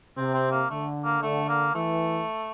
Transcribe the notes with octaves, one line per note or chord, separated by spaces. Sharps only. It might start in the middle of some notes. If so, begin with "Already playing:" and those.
C3 C4
C4
A#3
D3 A3
A#3
D3 A3
A#3
E3 A3